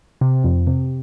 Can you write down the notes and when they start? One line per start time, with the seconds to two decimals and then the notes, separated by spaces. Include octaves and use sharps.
0.21 C3
0.44 F2
0.67 C3